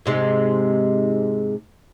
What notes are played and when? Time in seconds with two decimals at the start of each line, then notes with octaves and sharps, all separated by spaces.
0.06 G#2 C3 G#3